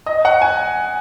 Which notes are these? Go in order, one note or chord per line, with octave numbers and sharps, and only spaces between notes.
D#5
F#5
G#5